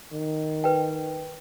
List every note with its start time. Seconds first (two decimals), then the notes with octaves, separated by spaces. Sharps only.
0.13 D#3
0.64 B4 G5